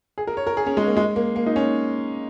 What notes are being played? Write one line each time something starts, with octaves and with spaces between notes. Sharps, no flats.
G#4
A#4
C#5
A#4
G#4
C#4
G#3
A#3
G#3
A#3
A#3
D#4
C#4